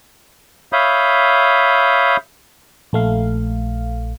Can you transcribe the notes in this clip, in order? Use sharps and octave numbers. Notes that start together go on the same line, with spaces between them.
C#5 E5 F5 B5 D#6 G6
A#1 A3 F5